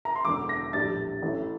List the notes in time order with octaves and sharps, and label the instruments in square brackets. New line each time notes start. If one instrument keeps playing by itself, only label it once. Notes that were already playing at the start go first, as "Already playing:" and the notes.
[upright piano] A#5
C6
E1 E2 D3 D6
A#6
A#1 A2 G3 D4 A6
A1 A2 E3 A3 E4